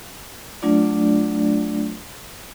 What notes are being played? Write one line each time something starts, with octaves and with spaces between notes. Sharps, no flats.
F#3 A3 D4 F4 D5